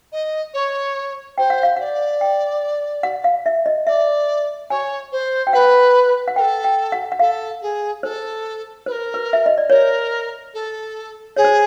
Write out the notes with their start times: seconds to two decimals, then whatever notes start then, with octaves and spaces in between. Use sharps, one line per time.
0.12 D#5
0.53 C#5
1.38 C5 G5
1.50 F#5
1.63 F5
1.76 D5 F#5
2.21 G5
3.03 F#5
3.24 F5
3.46 E5
3.66 D#5
3.87 D5 E5
4.70 C#5 G#5
5.12 C5
5.47 G5
5.53 B4 F#5
6.28 F#5
6.36 A#4 G5
6.40 A4
6.64 G5
6.92 F#5
7.12 F#5
7.19 A4 F5
7.61 G#4
8.03 A4 C5
8.86 B4 C5
8.91 A#4
9.14 B4
9.33 E5
9.46 D#5
9.58 D5
9.69 A#4 C#5
10.54 A4
11.36 G#4 C#5
11.44 C5